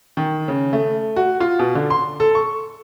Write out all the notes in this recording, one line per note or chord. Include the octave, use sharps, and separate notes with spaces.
D#3
C#3
A3
F#4
F4
B2
D3
C6
A4
C#6